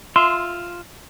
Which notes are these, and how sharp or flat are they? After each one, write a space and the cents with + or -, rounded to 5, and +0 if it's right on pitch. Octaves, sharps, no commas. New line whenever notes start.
F4 +0 E5 +0 C6 -15